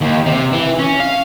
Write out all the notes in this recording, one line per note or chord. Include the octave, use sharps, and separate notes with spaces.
D#2
C3
E3
C#4
F5